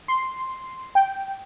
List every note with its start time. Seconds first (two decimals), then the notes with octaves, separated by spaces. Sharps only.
0.08 C6
0.95 G5